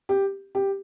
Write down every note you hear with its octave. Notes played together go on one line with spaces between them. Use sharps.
G4
G4